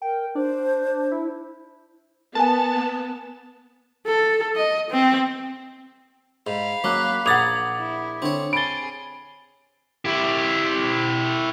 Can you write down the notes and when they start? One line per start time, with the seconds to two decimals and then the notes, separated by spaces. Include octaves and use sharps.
0.02 A#4 G5
0.35 D4 C5
1.11 E4
2.35 B3 A#4 G#5 A5
4.07 A4
4.56 D#5
4.91 C4
6.47 G#2 F5 B5
6.84 F#3 A#3 C#4 D6 F#6
7.26 A#1 F#5 A#5 D6 D#6 G#6 A6 F7
7.78 E4
8.22 D3 C4 C#5
8.53 G#4 B5 A6 D7 G7
10.05 E4 G4